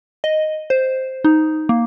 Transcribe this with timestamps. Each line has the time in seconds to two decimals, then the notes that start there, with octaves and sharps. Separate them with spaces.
0.24 D#5
0.70 C5
1.24 D#4
1.69 A#3